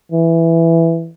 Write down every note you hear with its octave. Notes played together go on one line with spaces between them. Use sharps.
E3